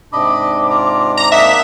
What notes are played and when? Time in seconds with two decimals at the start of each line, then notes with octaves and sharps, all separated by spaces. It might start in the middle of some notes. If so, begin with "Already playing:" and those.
0.13 G#2 C3 D4 D#5 B5 D6
0.71 F4 A#5
1.17 A#5 C6
1.32 A#3 D#5 E5 F#5